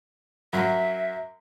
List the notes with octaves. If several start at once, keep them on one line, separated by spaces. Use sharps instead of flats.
F#2 F#3 E5